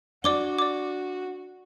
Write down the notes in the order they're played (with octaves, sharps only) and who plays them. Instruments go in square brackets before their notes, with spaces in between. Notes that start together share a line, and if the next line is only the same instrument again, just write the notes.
[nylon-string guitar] D4 [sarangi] F#4 [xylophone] D5 D6 G7
[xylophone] D5 D6